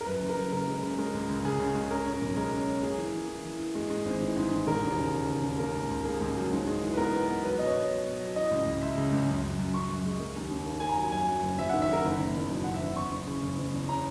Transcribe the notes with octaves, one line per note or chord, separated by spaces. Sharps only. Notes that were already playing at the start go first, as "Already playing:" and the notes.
A#4
F#2 B4
F#1
A#4
F#2
C#3 A#4
G#3
C#3
G#3 A#4
C#2
C#2
C#3 G#4
C#3
G#3
C#4 A#4
C#4
A#4
B1
G#3 A#4
C#4
C#4
A#3 G#4
E3
E3
E3
E3
E3
G#3
G#3
G#1
E3
G#2
E3
E1 A#4
D#2
C#3
C#3
C#3
D#2
A#3 A#4
C#2
C#2
A#3 G#4
C#2
F#3
G#2
G#3
E3
B4
B3 A#4
B3
B3
F#3 B4
B2 D#5
C#5
B2
B2
B2
F#3
E3 D#5
C#2
C#2
C#2 E5
C#3
C#2
F#2
F#2
F#2
F#2 C#6
F#2
G#3
A#3
D#2
D#2
A#3
A#3 G#5
A#5
F#3
F#2 G#5
F#3
F#1
F#1 E5
F#5
D#3
E5
D#3 A#4
F#1
F#1
E2
B2
F#1 F#5
E5
F#1
E2 C#6
F#1
C#3
F#1
F#1
E2
C#4 A#5